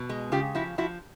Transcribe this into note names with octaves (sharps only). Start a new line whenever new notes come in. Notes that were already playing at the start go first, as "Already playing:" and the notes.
Already playing: B2
G#3
C#3 F4 G4
F3 E4 F#4
F3 E4 F#4